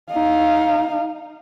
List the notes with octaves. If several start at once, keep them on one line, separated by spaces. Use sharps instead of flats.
D#4 F5